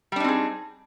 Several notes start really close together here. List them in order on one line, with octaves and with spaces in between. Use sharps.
G3 D4 D#4 C4 G#4